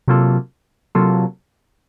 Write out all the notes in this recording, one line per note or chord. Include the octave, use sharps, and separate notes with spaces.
C3 F#3 A#3 F4 A4
C3 F#3 A#3 F4 A4